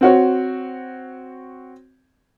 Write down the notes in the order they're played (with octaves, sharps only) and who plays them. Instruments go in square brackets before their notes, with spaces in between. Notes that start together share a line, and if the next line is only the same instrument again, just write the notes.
[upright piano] C4 F#4 C#5